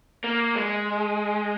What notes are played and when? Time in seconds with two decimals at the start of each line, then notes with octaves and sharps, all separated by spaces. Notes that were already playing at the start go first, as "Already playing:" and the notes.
0.24 A#3
0.56 G#3